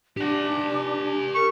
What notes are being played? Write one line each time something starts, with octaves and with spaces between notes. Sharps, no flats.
D4 G4 F#5
A#4 C#6